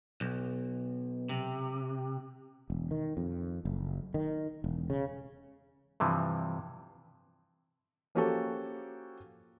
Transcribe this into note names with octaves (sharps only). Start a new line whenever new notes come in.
B1
C3
E1
D#3
F2
F#1
D#3
E1
C#3
G2 C3 E3 F3
F3 A#3 C#4 F#4 G4 A4